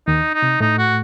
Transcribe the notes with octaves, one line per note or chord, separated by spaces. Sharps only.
D#2 D#3 D#4
D#4
C3
A2 A3 D#4
F#4